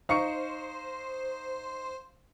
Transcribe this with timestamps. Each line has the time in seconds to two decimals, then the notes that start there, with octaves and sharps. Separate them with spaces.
0.09 D#4 C5 F5 C#6 C#7